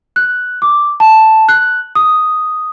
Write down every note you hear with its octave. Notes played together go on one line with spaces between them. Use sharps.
F#6
D6
A5
F#6
D#6